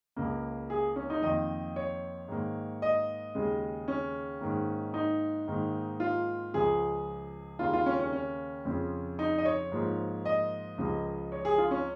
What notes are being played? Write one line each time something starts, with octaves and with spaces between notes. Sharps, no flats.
C#2 C#3 A#3
G#4
C#4
D#4
F2 D#3 A#3 D#5
C#5
G#2 D#3 A#3
D#5
D#2 C#3 G#3
C#4
G#2 D#3 A#3
D#4
G#2 D#3 A#3
F4
C#2 C#3 F3 G#3 G#4
D#2 C#3 A#3 F4
F4
C#4
C#4
C#4
F2 C#3 F3
D#4
D#5
C#5
G#2 F3 A#3
D#5
C#2 C#3 F3
C#5
G#4
F4
C#4